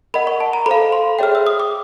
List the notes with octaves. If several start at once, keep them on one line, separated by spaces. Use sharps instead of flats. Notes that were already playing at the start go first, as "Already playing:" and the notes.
A#4 D#5 F#5 B5
C#6
A5
A#5
A4 C5 F5 B5
C6
G#4 C#5 E5 G5 F6
E6
D#6
D6